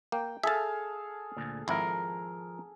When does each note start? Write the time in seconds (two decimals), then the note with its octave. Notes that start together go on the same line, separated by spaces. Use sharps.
0.12 A#3 G5
0.43 G#4 A4 E5 F5 A5
1.37 D2 A#2
1.68 G#1 F3 E4 A#4